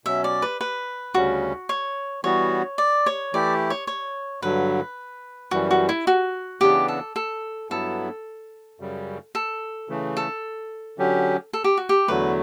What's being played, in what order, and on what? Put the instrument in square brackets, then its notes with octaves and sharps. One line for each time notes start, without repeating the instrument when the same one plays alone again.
[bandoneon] B2 F#3 C#4 [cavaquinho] E5
[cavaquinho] D5
B4
B4
[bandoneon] D2 C#3 G3 C#4 [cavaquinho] F#4
[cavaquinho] C#5
[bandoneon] E3 G3 B3 F#4 [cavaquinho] C#5
[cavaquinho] D5
C#5
[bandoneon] E3 A3 E4 G4 [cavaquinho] D5
[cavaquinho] C#5
C#5
[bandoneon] G2 D3 F#3 [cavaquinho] B4
[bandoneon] F#2 E3 G3 [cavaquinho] F#4
[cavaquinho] F#4
E4
F#4
[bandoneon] C#3 E3 B3 D4 [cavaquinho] G4
[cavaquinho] A4
A4
[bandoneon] G2 F#3 B3 E4 [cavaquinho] A4
[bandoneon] F#2 C#3 G3
[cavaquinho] A4
[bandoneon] C#3 E3 A3
[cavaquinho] A4
[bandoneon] D3 F#3 C#4 G4
[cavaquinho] A4
G4
F#4
G4
[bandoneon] E2 D3 F#3 A3 [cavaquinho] B4